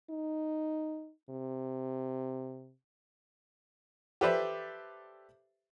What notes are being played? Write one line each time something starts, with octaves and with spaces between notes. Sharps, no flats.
D#4
C3
G4 A4 B4 C5 D5 E5